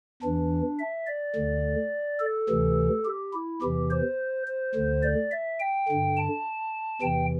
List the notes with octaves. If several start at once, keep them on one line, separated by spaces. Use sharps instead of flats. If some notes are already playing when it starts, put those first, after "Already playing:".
E2 E3 D4
E5
D5
D2 D3
A4
D2 C3 E3
G4
E4
E2 C3 E3 G4
C5
C5
D2 D3
D5
E5
G5
G2 D3
A5
E2 C3 E3 G5